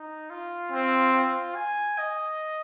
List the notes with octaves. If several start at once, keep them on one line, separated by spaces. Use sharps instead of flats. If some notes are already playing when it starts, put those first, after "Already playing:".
Already playing: D#4
F4
C4
F4
G#5
D#5